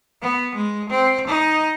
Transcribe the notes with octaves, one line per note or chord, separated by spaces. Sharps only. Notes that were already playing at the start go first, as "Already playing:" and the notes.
B3
G#3
C4
D#4